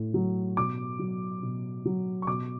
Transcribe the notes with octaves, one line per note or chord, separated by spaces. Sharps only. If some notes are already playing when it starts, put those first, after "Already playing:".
Already playing: A2
F#3
B2 D6
F#3
B2
F#3
C#6
B2 D6